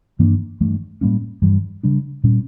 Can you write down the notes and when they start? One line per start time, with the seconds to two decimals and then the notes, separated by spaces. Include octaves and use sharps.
0.19 G2 E3 A#3 D4
0.61 G2 E3 A3
1.01 A2 G3 A#3 C#4
1.42 G2 E3 G3
1.83 C#3 G3 D4
2.24 A#2 G3 C#4